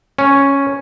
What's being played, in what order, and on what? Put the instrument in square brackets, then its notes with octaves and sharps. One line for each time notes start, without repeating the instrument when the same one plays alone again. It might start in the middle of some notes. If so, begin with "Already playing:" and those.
[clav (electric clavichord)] C#4